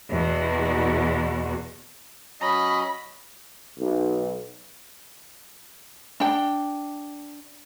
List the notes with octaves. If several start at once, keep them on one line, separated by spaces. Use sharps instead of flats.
E2 B2 F#4
F#3 C#4 D#5 B5
B1
D4 G5